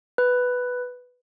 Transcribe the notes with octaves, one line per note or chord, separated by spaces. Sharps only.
B4